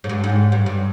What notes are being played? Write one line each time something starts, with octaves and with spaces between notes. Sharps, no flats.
G#2
G2
G#2
G2
G2